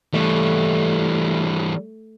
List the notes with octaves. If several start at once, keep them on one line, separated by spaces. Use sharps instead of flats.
E3 G3 A3